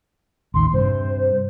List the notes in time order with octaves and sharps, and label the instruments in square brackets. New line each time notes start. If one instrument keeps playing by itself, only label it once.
[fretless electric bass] A1 D#2 D#3 [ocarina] C6
[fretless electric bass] G2 C3 [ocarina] C5